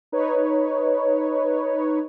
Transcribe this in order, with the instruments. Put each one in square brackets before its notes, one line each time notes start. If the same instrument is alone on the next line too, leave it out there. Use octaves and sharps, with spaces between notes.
[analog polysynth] D#4 B4 C#5